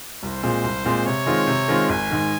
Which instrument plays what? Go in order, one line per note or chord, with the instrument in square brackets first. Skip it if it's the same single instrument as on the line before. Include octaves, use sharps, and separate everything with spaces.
[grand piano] C2 [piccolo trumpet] C5
[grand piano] A#2 G#3 C4
C2
A#2 G#3 C4
[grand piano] C3 [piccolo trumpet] C#5
[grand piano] D#3 G#3 C4 F4
C3
D#3 G#3 C4 F4
[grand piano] G#1 [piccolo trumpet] G#5
[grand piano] G#2 D#3